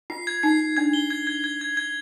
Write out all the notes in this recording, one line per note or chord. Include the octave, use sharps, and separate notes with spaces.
F4 C7
G#6
D#4 C7
C7
D4 G#6
G7
G#6
G#6
G#6
G#6
G#6